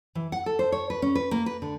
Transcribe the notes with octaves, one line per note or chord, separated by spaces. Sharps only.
E3
F#5
A4
C5
C#5
B4
C#4
B4
A#3
B4
D3